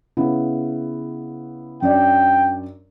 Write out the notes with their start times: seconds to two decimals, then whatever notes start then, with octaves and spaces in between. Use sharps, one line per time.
0.17 C#3 B3 E4
1.82 F#2 D4 D5 G5